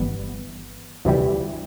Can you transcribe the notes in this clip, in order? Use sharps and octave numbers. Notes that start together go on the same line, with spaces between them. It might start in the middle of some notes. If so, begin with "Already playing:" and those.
Already playing: G1 G2 E3 G3 B3
D2 C3 E3 G3